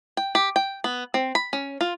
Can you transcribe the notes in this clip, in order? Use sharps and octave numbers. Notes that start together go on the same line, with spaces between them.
G5
G4
G5
B3
C4
B5
C#4
F4